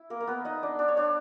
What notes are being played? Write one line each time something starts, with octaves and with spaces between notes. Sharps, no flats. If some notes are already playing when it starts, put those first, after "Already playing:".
Already playing: E4
A#3 A#4
A#4
B3 B4
D#4 D#5
D4 D5
D4 D5
C#5
D4 D5